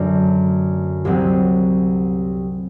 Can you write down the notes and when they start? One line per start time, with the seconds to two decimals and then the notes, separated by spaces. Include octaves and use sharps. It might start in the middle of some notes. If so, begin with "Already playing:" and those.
Already playing: F#2 D3 A3 D4
1.05 C2 C3 F#3 C4